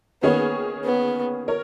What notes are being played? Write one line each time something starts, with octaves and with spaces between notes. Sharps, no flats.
D#3 A#3 B3 C#4 G#4 C#5
B3
A#4 C#5